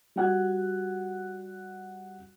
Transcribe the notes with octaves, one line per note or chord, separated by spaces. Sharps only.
G3 F#4 F#5 F#6 G#6